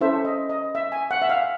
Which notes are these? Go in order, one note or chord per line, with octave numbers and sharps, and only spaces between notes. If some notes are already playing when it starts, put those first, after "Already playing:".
C#4 E4 A4 C5 E5
D#5
D#5
E5
G#5
F#5
E5
F5